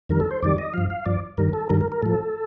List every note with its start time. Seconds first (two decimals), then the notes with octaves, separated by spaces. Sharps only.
0.09 F2 D#3 G3 A#4
0.20 A4
0.31 C5
0.43 F2 D#3 G3 D5
0.58 D#5
0.74 G2 F3 F5
0.90 F5
1.05 G2 F3 D5
1.38 G2 D#3 G3 A#4
1.53 A4
1.69 G2 D#3 G3 A#4
1.81 A#4
1.92 A#4
2.02 A2 F3 A4